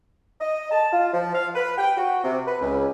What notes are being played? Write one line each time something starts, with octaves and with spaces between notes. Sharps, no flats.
D#5
A5
F4
F3
F5
B4
G5
F#4
C3
B4
C#2